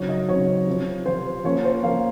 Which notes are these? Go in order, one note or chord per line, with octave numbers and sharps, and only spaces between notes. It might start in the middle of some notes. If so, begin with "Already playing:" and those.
Already playing: C#3 F#3 C4 D#4 C#5
D#5
C#3 F#3 C4 D#4 C#5
C3 F3 C4
C3 F3 C4 C5
F3 A#3 C#4 C#5
C5
F3 A#3 C#4 F5